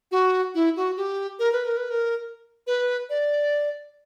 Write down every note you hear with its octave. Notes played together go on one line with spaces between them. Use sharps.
F#4
E4
F#4
G4
A#4
B4
A#4
B4
A#4
B4
D5